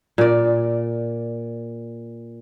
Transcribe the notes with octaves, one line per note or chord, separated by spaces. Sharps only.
A#2 D5